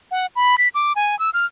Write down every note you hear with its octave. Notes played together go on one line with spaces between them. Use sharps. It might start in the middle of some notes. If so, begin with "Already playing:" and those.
F#5
B5
B6
D6
G#5
E6
F6